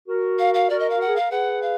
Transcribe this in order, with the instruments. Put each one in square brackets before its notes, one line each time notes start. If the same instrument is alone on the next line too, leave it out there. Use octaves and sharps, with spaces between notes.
[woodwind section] F#4 A#4
[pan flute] F5
F5
[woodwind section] F#4 A#4 [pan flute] D5
[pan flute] D#5
F5
[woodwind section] F#4 [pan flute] F#5
[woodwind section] G#4
[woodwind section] A#4 [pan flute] F5
[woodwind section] G#4 B4 [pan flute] F#5
[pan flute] F5